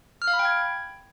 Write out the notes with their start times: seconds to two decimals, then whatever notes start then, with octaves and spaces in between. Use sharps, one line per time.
0.22 F6
0.27 F5
0.33 B5
0.39 G5
0.45 G#6